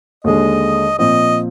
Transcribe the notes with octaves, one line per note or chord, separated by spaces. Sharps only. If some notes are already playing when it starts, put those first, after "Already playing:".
D#2 D3 G#3 D#5
A#2 F3 C4 D#5